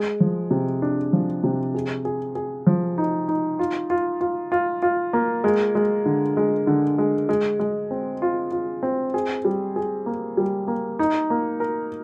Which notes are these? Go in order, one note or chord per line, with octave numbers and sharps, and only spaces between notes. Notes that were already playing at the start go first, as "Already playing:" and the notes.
Already playing: G#3
F3
C3
D4
F3
C3
G#4
G#4
G#4
F3
D#4
D#4
F4
F4
F4
F4
F4
A#3
G#3
G#3
D3
G#3
D3
G#3
G#3
G#3
C4
F4
F4
C4
G#4
G3
G#4
A#3
G3
A#3
D#4
A#3
A#4